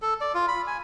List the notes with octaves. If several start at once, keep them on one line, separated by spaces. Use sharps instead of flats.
A4
D5
F4
B5
G#5